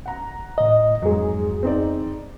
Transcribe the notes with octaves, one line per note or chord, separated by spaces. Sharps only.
F#5 A#5
A2 D#5
F2 G#2 F#3 G#4
C4 D#4 D5